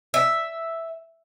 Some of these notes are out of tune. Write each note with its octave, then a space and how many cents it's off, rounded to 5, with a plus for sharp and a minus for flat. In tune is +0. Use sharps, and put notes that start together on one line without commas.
E5 +0